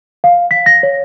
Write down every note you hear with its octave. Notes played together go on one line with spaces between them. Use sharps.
F5
B6
A#6
C#5